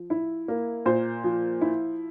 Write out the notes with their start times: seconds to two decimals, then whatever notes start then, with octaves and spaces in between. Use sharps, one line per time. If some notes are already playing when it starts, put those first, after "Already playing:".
Already playing: F3
0.10 E4
0.48 A#3
0.86 A#2 C5
1.24 F3
1.61 E4